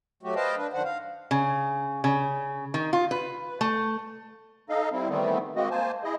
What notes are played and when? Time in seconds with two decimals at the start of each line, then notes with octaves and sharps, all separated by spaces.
0.23 F#3 A3 F#4 G4
0.36 B4 C5 D#5 F5 G5 A5
0.57 D4 B4
0.73 F#2 D#3 D4 C5 F#5
0.85 F5
1.31 C#3
2.04 C#3
2.74 D#3
2.93 F4
3.11 B4
3.61 A3
4.69 D#4 A4 D#5 F5
4.92 G3 C4 E4
5.09 D#3 E3 G3 A3 B3 C4
5.56 G#3 A#3 C4 F#4 D#5
5.71 A#3 C5 G#5 A5
6.04 E4 G#4 D#5